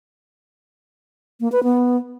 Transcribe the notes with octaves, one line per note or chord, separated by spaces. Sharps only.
A#3
B4
B3